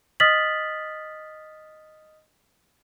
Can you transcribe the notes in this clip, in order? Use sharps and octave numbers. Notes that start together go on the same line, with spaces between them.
D#5 D#6 F6 A6 B6 F#7